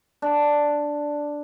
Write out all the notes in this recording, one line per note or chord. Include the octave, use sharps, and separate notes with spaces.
D4